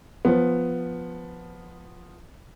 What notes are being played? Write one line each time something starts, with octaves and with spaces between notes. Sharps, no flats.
F3 B3